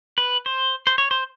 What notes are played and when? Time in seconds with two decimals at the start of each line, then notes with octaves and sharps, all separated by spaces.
0.18 B4
0.46 C5
0.87 C5
0.98 C#5
1.11 C5